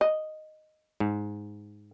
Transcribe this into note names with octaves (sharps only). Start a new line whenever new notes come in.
D#5
G#2